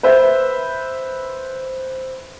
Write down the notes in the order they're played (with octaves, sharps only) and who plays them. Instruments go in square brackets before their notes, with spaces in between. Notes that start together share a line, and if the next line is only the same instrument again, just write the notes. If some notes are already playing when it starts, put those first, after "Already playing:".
[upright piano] B4 C5 E5